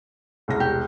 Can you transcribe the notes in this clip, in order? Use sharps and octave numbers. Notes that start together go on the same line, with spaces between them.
E1 C2 A#6
G4